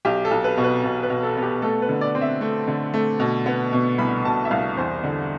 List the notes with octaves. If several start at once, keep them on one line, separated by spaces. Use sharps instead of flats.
B1 G4
A4
B1
B4
B2
B4
B2
B4
B2
A4
B3
G4
A3 A4
B4
D3
D5
C4
E5
A3
D3
A3
B2
B3
B2
C2 B5
B2 A5
E5
C2 F5
E2 C5
D3